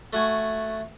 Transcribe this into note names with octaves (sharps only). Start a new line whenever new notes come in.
A3 F#4 G#5